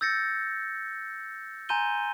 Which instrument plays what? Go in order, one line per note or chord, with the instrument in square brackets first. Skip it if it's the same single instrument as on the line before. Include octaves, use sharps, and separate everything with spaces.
[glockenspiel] E6 G6 A6 A#6 C#7
G#5 A#5 C6 G6 D#7 G7